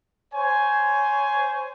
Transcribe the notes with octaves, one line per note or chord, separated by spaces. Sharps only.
C5 C#5 G#5